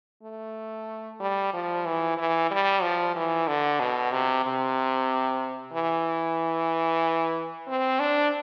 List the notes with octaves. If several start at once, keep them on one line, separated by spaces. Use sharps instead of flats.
A3
G3
F3
E3
E3
G3
F3
E3
D3
B2
C3
C3
E3
C4
D4